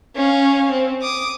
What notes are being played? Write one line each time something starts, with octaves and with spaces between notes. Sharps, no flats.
C#4 F5
C4
D6 D#6